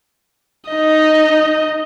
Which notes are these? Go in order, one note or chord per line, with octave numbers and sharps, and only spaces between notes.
D#4 D#5